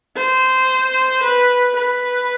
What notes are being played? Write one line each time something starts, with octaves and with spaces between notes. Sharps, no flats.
C5
B4
B4